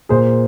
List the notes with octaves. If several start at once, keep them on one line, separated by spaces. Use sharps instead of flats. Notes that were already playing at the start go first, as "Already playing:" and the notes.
A#2 G#4 C5